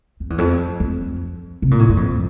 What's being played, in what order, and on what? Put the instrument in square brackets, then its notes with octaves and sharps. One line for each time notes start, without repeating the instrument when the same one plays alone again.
[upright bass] F2
E2
F2
F2
C3
A#2
A2
G2
F2